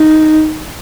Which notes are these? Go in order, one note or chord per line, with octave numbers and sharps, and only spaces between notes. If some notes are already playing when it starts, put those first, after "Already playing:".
Already playing: D#4